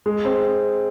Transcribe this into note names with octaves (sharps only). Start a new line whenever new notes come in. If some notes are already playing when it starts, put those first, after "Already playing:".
G#3
C4